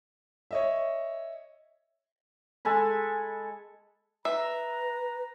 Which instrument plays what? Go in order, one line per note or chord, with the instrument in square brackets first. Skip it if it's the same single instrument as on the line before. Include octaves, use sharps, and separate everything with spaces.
[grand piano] C#5 D#5 E5
[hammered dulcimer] G#3 A4 G#5 B5
[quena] B4 [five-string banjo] E5 [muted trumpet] A#5